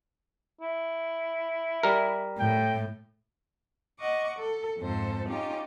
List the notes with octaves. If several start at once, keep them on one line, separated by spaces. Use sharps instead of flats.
E4
G3 A#4
A2 G5
D#5 F#5 C#6 D6
A4
F2 G#2 A4 C5
C#4 D#4 F4 G4